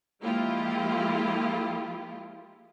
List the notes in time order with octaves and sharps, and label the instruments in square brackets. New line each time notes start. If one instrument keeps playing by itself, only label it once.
[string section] F3 G#3 A#3 E4 F4 G4